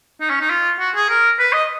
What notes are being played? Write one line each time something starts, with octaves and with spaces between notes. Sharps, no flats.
D#4
C#4
D#4
F4
F#4
G#4
A#4
B4
D#5